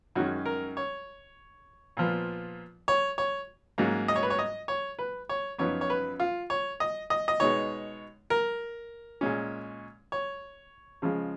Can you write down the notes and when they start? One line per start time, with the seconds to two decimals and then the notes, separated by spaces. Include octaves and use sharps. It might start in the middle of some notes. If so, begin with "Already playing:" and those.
0.16 F#2 D#3 G#3 C#4 F#4
0.46 A#4
0.77 C#5
1.97 A#2 F3 B3
2.88 C#5
3.18 C#5
3.78 G#2 F#3 A#3 C#4
4.08 D#5
4.16 C#5
4.23 B4
4.30 C#5
4.39 D#5
4.68 C#5
4.99 B4
5.29 C#5
5.58 F#2 F3 B3 D#4 C#5
5.81 C#5
5.90 B4
6.20 F4
6.50 C#5
6.80 D#5
7.10 D#5
7.28 D#5
7.40 B2 G#3 D#4 C#5
8.30 A#4
9.21 A#2 G#3 C#4
10.12 C#5
11.02 C#3 F3 G#3